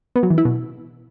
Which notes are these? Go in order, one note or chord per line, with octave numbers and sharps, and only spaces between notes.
B3
F#3
E3
E4
B2